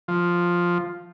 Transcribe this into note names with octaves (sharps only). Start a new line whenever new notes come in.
F3